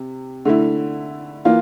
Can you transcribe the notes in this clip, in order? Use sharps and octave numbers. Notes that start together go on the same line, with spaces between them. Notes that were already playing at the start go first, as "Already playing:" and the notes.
Already playing: C3
D3 A3 E4
E3 A#3 F4